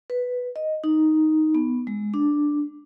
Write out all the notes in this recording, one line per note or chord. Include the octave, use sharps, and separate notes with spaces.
B4
D#5
D#4
B3
G#3
D4